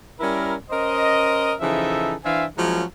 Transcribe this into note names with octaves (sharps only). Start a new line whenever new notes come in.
G3 C#4 E4 A#4
C#4 A#4 C5 D#5
C#3 E3 F3 D#4 A4 E5
E3 D4 C5 E5 F5 G#5
F3 F#3 G#3 A#3 C#4 E4